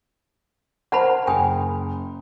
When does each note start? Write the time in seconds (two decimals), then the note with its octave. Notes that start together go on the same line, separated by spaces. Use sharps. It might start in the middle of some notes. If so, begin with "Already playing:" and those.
0.92 A#4 C5 F#5 A5 B5
1.27 F#1 G5 G#5 D#6